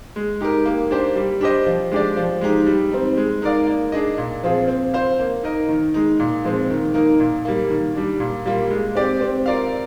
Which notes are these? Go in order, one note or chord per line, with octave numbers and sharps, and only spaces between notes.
G#3
D#4 G4 A#4
A#3
D4 G4 C5
G3
D4 G4 C5 D#5
F3
G#3 D4 G4 D5
F3
G#3 D#4 G4
G3
C4 D#4
G#3
D#4 A#4 D5 F5
A#3
D4 G#4 D#5
A#2
F3 C4 F4 G#4
C4
F4 C5 F5
A#3
D#4 A#4 D#5
D#3
G#3 D#4
A#2
F3 G#3 C4
D#3
A#3 D#4 A#4
A#2
G3 A#3
D#3
G3 D4
A#2
G3 A#3 F4
G#3
C4 G4 D5
C4
F4 A#4 D5 F5